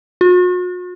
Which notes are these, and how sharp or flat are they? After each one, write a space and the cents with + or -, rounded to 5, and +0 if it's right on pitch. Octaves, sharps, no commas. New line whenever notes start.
F#4 -45